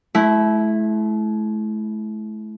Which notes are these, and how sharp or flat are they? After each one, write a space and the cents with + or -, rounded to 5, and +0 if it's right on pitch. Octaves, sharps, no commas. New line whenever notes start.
A3 -40 E4 +0